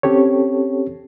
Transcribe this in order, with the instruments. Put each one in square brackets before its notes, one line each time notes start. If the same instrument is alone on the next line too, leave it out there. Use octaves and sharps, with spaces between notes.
[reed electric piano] C4 C#4 G4 A4 C#5